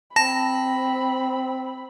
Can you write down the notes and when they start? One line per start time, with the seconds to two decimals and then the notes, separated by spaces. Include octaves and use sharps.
0.16 C4 A5 B5 A#6